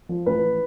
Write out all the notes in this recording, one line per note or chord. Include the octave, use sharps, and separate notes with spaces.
F3
A1 B4